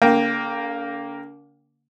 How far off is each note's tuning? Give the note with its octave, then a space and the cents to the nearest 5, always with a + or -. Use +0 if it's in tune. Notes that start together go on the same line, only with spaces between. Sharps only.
D3 -40 A#3 +0 G5 +0